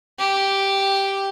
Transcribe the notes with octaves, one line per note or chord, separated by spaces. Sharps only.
G4